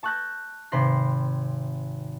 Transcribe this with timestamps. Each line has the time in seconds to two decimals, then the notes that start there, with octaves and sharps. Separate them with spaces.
0.03 A5 C#6 E6 F#6 G6 A#6
0.72 G#1 C3 B5 C6 A#6